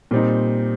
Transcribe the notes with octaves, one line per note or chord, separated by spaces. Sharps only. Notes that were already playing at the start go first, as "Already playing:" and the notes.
A#2 G3 C4 D#4